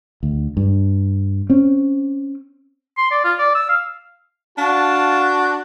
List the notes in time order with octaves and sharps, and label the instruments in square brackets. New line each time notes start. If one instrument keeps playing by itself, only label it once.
[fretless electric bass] D2
G2
C4 C#4
[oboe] C6
D5
F4
D5
E6
F5
[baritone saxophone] D4 [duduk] F#4 [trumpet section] F5 A5